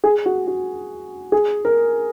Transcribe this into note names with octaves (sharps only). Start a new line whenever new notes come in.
G#4
F#4
F#4
G#4
A#4